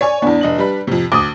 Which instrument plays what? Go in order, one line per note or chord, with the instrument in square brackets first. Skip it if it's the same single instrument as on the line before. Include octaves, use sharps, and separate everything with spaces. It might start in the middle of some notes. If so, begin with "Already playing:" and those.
[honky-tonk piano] C#5 G#5 C#6 [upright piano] D5
[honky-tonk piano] E2 B3 [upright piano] D4
[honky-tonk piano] F1 D#5 F#7
G3 B4
F2 C3
[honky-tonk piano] D2 [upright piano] D6 D#6